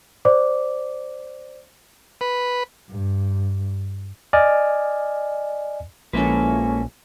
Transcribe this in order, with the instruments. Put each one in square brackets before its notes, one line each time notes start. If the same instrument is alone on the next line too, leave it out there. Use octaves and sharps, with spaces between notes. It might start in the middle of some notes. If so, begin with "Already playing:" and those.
[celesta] C5 D5 D6
[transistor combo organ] B4
[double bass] G2
[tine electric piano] D5 D#5 G#5 F6
[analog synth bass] A#1 [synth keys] F3 E4 A4 [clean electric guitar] G#3 A#3 B4 [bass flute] C#4